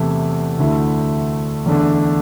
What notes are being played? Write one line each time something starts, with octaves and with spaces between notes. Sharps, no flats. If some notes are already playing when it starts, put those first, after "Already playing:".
Already playing: E2 C3 E3 A3 E4
D2 D3 A3 E4
E2 D3 A3 D4